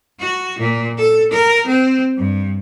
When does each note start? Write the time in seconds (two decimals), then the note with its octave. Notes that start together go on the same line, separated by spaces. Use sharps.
0.19 F#4
0.59 A#2
0.98 A4
1.31 A#4
1.67 C4
2.17 G2